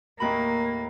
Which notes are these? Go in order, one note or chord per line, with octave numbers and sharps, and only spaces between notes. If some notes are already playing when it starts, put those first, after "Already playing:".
D#2 A2 A#3 B5